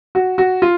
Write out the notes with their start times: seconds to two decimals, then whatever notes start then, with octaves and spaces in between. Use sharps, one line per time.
0.15 F#4
0.38 F#4
0.62 F4